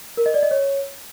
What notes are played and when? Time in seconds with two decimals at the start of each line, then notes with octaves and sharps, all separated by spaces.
0.17 A#4
0.26 D#5
0.34 D5
0.43 D#5
0.51 C#5